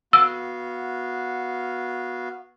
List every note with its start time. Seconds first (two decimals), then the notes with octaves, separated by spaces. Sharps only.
0.13 B3 F#4 F5 E6